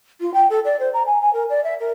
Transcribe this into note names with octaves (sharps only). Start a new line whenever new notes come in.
F4
G5
A4
D5
C5
A#5
G#5
G#5
A#4
D5
E5
A#4